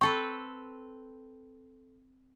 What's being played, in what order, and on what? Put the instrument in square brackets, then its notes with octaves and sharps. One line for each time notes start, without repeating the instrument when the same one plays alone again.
[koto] C4 A4 B4 [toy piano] C#6